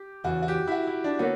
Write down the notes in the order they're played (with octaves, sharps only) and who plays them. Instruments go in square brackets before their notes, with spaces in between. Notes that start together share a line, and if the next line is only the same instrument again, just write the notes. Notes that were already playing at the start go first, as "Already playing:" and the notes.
Already playing: [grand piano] G4
[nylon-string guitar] E2 C#3 E3 [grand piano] F#4
[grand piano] F#4
G4
E4
F#4
E4
D4
[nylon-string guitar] D3 A#3 D4 F#4 C#5 [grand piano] B3